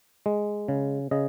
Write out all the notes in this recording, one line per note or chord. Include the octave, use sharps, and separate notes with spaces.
G#3
C#3
C#3 D#5